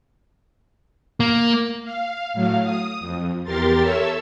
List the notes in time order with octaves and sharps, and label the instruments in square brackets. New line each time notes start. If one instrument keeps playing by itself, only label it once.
[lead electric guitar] A#3
[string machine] F5
A2 F#3 F5
D#6
F2
E2 G4 A#4 C6 A6
A4 C#5 E5 E6